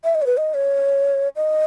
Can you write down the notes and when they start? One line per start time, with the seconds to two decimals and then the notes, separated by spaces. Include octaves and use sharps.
0.04 E5
0.15 D#5
0.22 C#5
0.27 B4
0.37 D#5
0.54 C#5
1.36 D#5